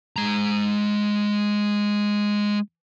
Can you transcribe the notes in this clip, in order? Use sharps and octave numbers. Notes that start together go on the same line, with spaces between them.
G#3 A#5